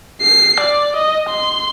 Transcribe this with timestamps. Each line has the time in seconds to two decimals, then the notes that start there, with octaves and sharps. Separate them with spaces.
0.22 C7
0.61 D5
0.97 D#5
1.30 C6